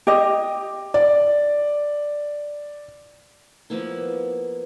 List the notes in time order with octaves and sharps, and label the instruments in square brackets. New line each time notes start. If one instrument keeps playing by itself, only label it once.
[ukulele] G4 D#5
[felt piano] D5
[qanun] F3 A#3 B3 E4